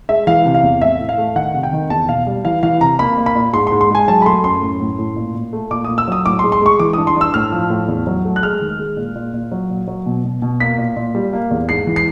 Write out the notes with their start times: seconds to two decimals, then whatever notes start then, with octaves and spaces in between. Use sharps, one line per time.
0.09 G#3 E5
0.27 E3 F5
0.46 C3
0.55 F5
0.63 E2
0.82 A2 E5
1.00 A2
1.09 F5
1.18 A3
1.36 D#3 F#5
1.54 C3
1.63 G5
1.73 D#3
1.90 E2 A5
2.08 B2 F5
2.27 G3
2.45 E3 F5
2.63 E3 F5
2.81 C3 A#5
2.99 A#3 B5
3.18 A#3
3.26 B5
3.35 A#2
3.53 G#2 C6
3.67 C6
3.72 G#2
3.81 C6
3.90 G#3 G#5
4.08 F#3 A5
4.22 B5
4.26 A3 C6
4.44 F#2 C6
4.62 A2
4.80 A2
4.99 A2
5.16 A#2
5.35 A#2
5.53 A3
5.71 A#2 D6
5.84 A#2 D#6
5.98 E6
6.08 F#3 D#6
6.26 A2 D6
6.39 C6
6.43 G#3
6.52 C6
6.61 G#3 C#6
6.80 E3 D6
6.93 G2 D#6
7.07 C6
7.16 G2 E6
7.34 A2 F6
7.52 F3
7.70 A2
7.88 E2
8.07 F#3
8.25 A3
8.36 F#6
8.43 G#3 F6
8.61 D#3
8.79 G#3
8.97 A#2
9.15 A#2
9.33 A#2
9.52 F#3
9.70 A#2
9.88 F#3
10.06 B2
10.24 B2
10.42 B2
10.60 A#3 B6
10.78 A#2
10.96 A#2
11.15 G3
11.33 A#3
11.51 E2
11.69 G#2 C7
11.87 E3
11.96 C7